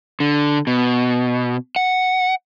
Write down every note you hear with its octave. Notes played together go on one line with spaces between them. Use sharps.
D3
B2
F#5